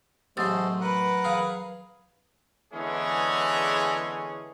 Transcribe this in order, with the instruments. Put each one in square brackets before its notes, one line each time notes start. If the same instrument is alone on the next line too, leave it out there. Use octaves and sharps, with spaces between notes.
[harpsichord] A1 C6 [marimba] F#3 D#6 E6 [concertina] G#3 A3 C5
[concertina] A#4 F#5 [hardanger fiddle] B4
[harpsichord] G#4 F5
[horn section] D3 E3 G#3 B3 C#4 G#4